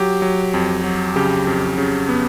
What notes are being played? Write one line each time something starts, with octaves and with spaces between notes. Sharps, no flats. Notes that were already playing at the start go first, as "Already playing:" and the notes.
Already playing: F#3 G4
F#3
F2
F#3
C#3 G4
F2
C#3
B3